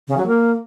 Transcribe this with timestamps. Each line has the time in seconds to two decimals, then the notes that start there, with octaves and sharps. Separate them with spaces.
0.08 C#3
0.17 F#3
0.27 A#3